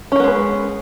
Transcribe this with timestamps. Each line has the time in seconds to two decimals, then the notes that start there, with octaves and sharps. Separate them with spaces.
0.12 C#4
0.16 A#4
0.20 B3
0.24 G#3
0.28 B4